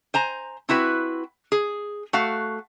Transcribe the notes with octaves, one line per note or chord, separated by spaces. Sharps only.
C5 G#5 A#5
C4 E4 F#4 B4
G#4
A3 F#4 F5